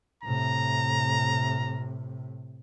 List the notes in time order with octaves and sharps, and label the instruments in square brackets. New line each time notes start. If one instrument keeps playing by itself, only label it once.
[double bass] A2 C3 [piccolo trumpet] A#5